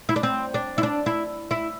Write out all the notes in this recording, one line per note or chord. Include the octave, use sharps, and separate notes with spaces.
E4
D4
C4
D4
E4
D4
E4
E4